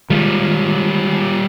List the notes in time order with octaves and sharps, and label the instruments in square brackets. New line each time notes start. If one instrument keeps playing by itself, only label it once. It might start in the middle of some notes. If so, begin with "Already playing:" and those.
[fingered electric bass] D#3 G#3 [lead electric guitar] G3 F4